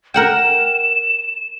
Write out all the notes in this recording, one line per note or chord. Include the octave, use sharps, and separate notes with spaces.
A#4 F#5 G5 E7